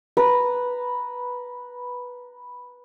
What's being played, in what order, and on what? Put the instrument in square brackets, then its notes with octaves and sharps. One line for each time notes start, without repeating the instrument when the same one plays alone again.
[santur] B4 A#5